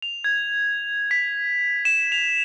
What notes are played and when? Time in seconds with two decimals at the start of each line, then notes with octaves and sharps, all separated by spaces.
0.02 F7
0.24 G#6
1.11 B6
1.85 E7
2.12 F7